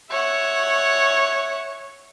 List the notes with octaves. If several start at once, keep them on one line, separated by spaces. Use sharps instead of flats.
C#5 E5 F#5